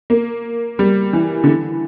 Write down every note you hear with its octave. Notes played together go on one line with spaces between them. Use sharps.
A#3
G3
E3
D3
E3